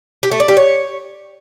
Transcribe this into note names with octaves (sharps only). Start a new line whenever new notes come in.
G4
A3
D5
G4
C#5